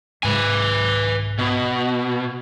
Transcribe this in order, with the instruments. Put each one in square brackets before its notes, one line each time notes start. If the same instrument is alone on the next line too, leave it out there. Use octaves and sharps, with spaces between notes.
[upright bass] C2 G#2 [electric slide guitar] B4 G#5
[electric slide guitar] B2